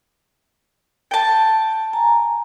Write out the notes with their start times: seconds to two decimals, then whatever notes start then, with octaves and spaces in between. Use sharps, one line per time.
1.11 G5 A5
1.93 G#5 A#5